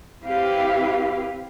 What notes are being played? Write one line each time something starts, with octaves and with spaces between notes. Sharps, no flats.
C4 E4 G4 B4 F5